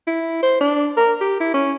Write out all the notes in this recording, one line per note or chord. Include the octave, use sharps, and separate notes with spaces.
E4
C5
D4
A#4
G4
E4
C#4